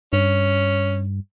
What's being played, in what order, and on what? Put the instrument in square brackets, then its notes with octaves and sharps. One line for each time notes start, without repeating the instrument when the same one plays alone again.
[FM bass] G2 [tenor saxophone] C#4